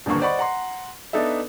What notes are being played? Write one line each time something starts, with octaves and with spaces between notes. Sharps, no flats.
D#1 E2 G2 D3 A#3 C#6
C5 D5 D#5 F#5 B5 C#6
F#5 A#5 C6
B3 D4 D#4 A4 E5